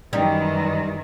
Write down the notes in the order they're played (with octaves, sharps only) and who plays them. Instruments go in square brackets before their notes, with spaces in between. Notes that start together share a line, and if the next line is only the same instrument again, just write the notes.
[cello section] F#2 D#3 E3 [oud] G3 D#4